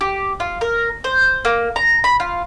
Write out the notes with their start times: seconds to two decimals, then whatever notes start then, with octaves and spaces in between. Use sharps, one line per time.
0.01 G4
0.40 F4
0.61 A#4
1.04 C5
1.45 A#3
1.76 A#5
2.04 B5
2.20 F4